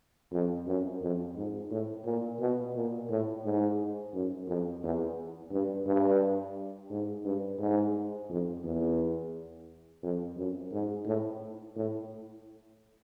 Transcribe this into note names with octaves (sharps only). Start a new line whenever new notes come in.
F2
F#2
F2
G#2
A2
A#2
B2
A#2
A2
G#2
F#2
F2
E2
G2
G2
G#2
G2
G#2
F2
E2
F2
F#2
G#2
A2
A2